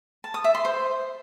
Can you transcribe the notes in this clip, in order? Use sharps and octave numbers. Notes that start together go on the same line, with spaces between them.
A5
D#6
E5
C6
C5